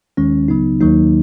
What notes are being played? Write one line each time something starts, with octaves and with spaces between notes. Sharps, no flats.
D#2 D#3 G#3 C#4
C#2 C#3 F#3 B3 D#4
D#2 D#3 F#3 A#3 D#4